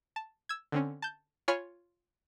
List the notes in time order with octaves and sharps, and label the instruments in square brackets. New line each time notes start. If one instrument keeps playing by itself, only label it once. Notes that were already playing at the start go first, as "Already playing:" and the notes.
[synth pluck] A5
E6 G#6
D3 C4 C#4
A5 G6
F4 C#5 G#5 B5 C6 F6